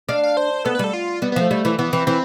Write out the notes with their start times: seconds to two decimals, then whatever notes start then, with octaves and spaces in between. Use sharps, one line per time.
0.09 D4 F5
0.23 F5
0.37 C5
0.65 B3 A4
0.75 B4
0.79 G3 A4
0.93 F4
1.22 G3 B3
1.32 B3
1.36 F3 A3
1.51 G3
1.65 E3
1.79 E3 B3
1.93 E3 C4
2.07 E3 C4